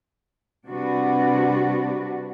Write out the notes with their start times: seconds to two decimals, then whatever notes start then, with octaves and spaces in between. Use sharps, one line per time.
0.66 C3 G3 D4 F#4 B4